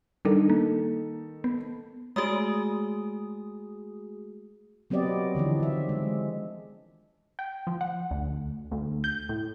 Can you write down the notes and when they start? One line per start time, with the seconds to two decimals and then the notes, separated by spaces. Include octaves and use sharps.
0.25 D#3 G3 D4 D#4 A4
0.50 A#3
1.44 B3
2.16 G#3 A3 F#4 G#4 D#6
4.90 F#3 B3 C4 G4 D5 D#5
5.35 D3 E3 F3 D4
5.60 D#3 E5
5.89 G#3
7.39 G5
7.67 F3
7.81 F#5
8.11 D2
8.72 D2
9.04 G6
9.29 A2